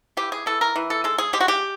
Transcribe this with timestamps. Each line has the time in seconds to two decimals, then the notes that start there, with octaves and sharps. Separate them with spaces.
0.17 E3 G4
0.32 G#4
0.46 E3 A4
0.61 A#4
0.76 E3
0.90 A4
1.04 G#3 A4
1.18 G#4
1.33 G#3 G4
1.40 F#4
1.48 G4